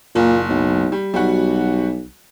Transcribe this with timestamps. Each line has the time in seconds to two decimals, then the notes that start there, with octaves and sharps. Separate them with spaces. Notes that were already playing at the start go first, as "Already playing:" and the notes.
0.15 F#1 A#2
0.49 B1
0.92 G3
1.14 B1 G3 F#4